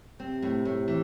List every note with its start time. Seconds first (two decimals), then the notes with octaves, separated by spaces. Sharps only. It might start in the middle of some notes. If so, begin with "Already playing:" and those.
0.19 C3 C4
0.42 A2
0.65 A2
0.88 E3